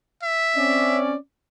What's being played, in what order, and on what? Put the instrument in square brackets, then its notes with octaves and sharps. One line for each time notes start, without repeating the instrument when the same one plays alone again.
[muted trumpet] E5
[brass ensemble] C4 C#4 D5